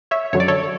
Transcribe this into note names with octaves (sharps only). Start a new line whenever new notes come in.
C#5 E5
F#2 D3 F#3 C#5
D5
A4 C#5